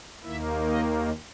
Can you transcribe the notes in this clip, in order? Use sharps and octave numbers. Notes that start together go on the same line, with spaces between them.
D#2 D#3 A#3 E4 E5
D#4 D#5